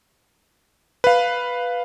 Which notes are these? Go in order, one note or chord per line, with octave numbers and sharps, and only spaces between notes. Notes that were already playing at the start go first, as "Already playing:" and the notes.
B4 F5